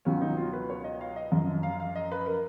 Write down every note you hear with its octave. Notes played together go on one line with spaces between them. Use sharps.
C#2 B2 F#3 C#4
D#4
F4
B4
C#5
D#5
F5
D#5
F#2 F3
F5
F5
D#5
B4
A#4